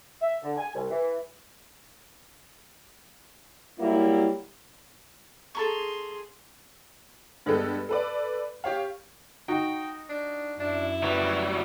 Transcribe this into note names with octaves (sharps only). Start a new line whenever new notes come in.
E5
D3
G#5
C2
E3
F#3 G3 A#3 E4
G#4 A4 A#5 C6 C#6
G2 G#3 B3 G4 A4 B4
A4 B4 D5
G4 C#5 F5
D#4 F#4 G5
D4
F#2 D4 E4
F#3 G3 B4